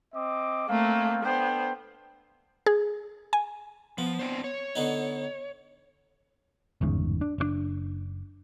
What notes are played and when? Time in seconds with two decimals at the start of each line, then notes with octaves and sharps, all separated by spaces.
0.14 C4 D#5 D6
0.69 A3 A#3 C4 F5
1.23 B3 D4 A4 C5 G5
2.66 G#4
3.33 G#5
3.98 F3 B3
4.19 C4 D4 C5
4.44 C#5
4.75 D3 B3 D#4
6.81 G1 E2 G#2 C#3
7.21 D4
7.38 F#1 C3 D4